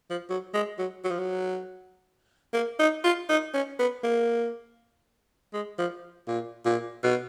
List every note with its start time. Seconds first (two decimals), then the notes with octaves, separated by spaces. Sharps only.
0.10 F3
0.30 F#3
0.54 G#3
0.79 F#3
1.04 F#3
1.11 F3
1.19 F#3
2.53 A#3
2.79 D#4
3.04 F4
3.29 D#4
3.54 C#4
3.79 B3
4.03 A#3
5.53 G#3
5.78 F3
6.27 A#2
6.65 A#2
7.03 B2